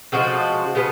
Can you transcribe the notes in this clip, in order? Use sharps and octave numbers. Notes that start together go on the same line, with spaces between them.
C#3 F3 G#3 F#4 A4
C#3 G#3 B3